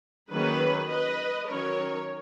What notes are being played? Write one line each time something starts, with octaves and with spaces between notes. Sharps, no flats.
D#3 F#3 A#3 C#4 G#4 B4
B4 D#5
D#3 F#3 C#4 A#4 C#5